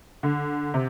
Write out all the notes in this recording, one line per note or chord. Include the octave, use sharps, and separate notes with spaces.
D3
C3